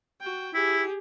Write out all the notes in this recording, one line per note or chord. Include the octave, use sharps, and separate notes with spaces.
F#4 G5
E4 G4 G#4